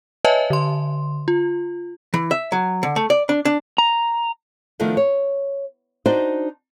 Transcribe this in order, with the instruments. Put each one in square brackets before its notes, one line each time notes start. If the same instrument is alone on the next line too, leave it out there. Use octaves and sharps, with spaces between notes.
[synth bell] B4 C#5 D#5 E5 G#5 A5
D3 C6
F4
[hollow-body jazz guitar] E3
E5
F#3
D3
A3
D5
D4
D4
[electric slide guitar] A#5
[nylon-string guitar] D#3 F3 A3 B3 D4 D#4
C#5
D4 D#4 F#4 C5 D5 D#5